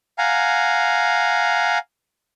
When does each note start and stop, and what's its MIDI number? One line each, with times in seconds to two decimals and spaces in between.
0.18 1.78 77
0.18 1.78 78
0.18 1.78 80
0.18 1.78 82